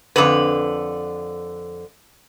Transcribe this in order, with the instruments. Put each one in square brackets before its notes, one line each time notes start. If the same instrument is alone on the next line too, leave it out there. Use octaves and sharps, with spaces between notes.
[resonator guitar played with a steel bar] F2 D3 B4